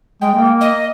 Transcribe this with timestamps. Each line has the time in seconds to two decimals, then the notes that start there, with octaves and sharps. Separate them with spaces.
0.21 G#3 G5
0.35 A#3
0.61 D#5